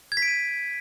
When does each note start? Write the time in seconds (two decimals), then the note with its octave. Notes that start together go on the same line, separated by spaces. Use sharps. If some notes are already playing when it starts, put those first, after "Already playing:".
0.12 G#6
0.17 B6
0.22 D7
0.28 D#7